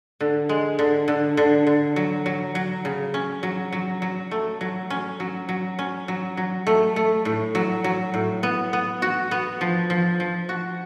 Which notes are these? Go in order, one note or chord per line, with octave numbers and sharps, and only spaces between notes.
D3
G#3
D3
D3
D3
D3
F#3
F#3
F#3
C#3
C#4
F#3
F#3
F#3
A3
F#3
C#4
F#3
F#3
C#4
F#3
F#3
A3
A3
A2
F#3
F#3
A2
B3
B3
F#4
B3
F3
F3
F3
F#4